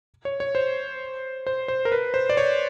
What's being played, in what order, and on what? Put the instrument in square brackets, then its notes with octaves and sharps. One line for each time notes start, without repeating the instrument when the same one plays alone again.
[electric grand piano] C#5
C#5
C5
C5
C5
A#4
B4
C5
D5
C#5